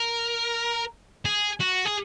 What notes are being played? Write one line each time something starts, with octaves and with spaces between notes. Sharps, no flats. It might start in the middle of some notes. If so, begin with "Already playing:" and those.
Already playing: A#4
G#4
F#4
G#4